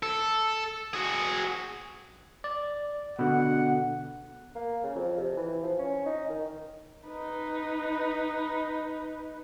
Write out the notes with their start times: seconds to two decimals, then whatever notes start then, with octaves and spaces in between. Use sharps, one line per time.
0.03 A4
0.93 F#4 G#4
2.44 D5
3.19 B2 D3 F#5
4.55 A#3
4.83 C#3
4.95 F2
5.18 C3
5.37 E3
5.63 F3
5.79 C#4
6.06 D#4
6.30 D#3
7.08 D#4 B4